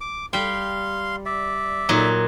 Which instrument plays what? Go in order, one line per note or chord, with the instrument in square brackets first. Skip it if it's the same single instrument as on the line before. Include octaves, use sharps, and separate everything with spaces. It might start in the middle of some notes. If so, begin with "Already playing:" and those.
[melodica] D6
[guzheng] G3 G5 [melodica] F5 C6
[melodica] D5 E5
[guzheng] A#2 F#3 D#4